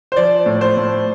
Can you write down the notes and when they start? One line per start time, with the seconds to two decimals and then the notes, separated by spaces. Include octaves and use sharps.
0.12 C5
0.16 F3 D5
0.46 A2
0.61 C5
0.77 A2